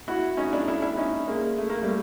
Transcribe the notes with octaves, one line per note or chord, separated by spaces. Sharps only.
E4 F#4
C#4 D#4
D4 E4
D4 E4
D4 E4
C#4 D#4
G#3 A#3
A3
A#3
G3 A3